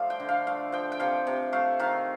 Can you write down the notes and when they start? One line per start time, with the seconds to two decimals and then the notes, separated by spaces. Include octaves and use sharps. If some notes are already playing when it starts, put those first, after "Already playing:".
Already playing: F3 A3 D5 F5
0.10 G5
0.20 D3
0.29 F5
0.47 A3 F5
0.72 F3 G5
0.92 G5
1.00 C3 F5
1.27 C3
1.52 A3 F5
1.79 D#3 F5